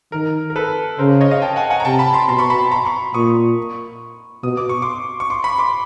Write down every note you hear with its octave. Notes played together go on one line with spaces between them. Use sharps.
D#3 A#4
A#4
A4 B4
C#3 A#4 C5
C#5 D#5
D#5 F5
G5 A5
F#5 G#5
F#5 G#5
A#5
C3 G5 A5
A5 B5
A#5 C6
B2 A#5 C6
B5 C#6
A5 B5
A#5 C6
B5 C#6
A#2 C#6 D#6
B2 D#6
D6
C#6
C6 D6
C#6
C6 D6
B5 C#6
C6 D6